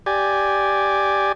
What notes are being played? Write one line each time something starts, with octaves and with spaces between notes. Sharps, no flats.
G4 D5 G#5